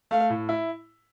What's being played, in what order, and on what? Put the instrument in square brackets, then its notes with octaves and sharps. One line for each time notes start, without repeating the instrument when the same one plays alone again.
[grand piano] A3 [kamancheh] F5
[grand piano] A2
E4